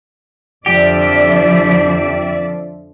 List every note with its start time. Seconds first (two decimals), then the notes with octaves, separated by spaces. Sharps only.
0.66 F2 D3 F3 G4 D5 E5